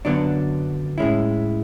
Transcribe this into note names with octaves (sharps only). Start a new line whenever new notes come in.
F#2 D3 F#3 B3 D4
A2 G#3 C#4 E4